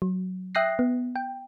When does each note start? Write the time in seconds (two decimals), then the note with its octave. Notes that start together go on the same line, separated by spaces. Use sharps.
0.02 F#3
0.55 E5 G5 D#6 F#6 A#6 C7
0.79 B3
1.16 G5